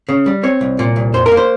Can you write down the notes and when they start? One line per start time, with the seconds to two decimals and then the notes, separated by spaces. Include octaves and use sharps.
0.09 C#3
0.26 G3
0.43 C4 C#5
0.61 C2
0.79 A#2
0.96 C2
1.14 F2 C5
1.26 A#4
1.31 A#3
1.37 C5